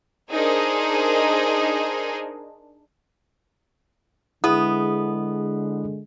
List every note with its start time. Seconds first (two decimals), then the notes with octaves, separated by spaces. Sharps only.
0.32 D4 D#4 G#4 A#4 C5 D#5
4.44 D3 G#3 B3 E4 G#4 D#6